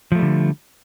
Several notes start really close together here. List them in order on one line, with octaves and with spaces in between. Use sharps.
F3 A3 G3 D3